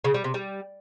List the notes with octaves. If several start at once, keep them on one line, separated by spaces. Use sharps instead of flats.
C#3
G3
C3
G3